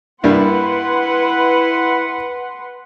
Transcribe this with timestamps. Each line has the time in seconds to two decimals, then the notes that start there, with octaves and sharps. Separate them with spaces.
0.24 G2 G3 A#3 E4 B4 F#5 C6